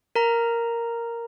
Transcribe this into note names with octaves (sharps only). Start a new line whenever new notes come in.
A#4 A#5